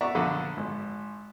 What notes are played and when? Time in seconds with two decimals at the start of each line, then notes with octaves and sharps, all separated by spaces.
0.01 D5 E5 F#5 A#5 C#6 D6
0.15 A#1 D3 F#3 A4 B5
0.57 G#1